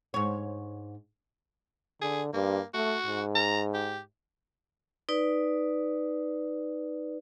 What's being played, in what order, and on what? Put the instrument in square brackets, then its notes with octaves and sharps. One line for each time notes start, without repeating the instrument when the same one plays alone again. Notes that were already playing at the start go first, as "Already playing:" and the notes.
[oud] G#2 C#5
[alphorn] D3 [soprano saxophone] G#4
[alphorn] G2 [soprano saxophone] A#3
[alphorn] A3 [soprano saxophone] F#4
[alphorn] G#2
[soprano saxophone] A#5
G4
[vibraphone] D#4 B4 D5